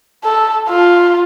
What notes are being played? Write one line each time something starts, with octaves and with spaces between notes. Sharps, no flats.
A4
F4